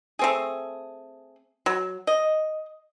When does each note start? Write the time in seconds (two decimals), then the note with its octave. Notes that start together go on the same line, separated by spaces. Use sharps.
0.19 A3 C4 G#4
1.66 F#3
2.07 D#5